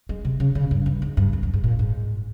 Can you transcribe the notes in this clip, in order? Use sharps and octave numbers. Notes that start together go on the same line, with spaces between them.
G#3
C3
C#3
C#3
G2
G2
G#2
G2
F2
G2
G#2
A#2
G#2